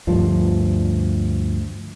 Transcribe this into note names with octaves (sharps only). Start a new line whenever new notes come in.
D2 G2 F3